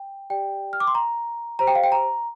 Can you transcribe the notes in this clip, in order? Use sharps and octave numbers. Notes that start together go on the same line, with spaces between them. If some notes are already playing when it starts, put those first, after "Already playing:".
Already playing: G5
G4 D5 G5
F6
D6
C6
A#5
G4 C5 A#5
G5
F5
G5
A#5